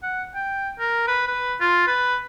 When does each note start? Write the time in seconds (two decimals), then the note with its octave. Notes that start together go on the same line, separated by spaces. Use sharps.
0.03 F#5
0.35 G5
0.80 A#4
1.07 B4
1.27 B4
1.61 F4
1.87 B4